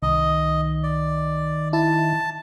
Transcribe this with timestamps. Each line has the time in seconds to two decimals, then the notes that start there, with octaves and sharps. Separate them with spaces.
0.03 C2 D#3 D#5
0.83 D5
1.73 E4 A5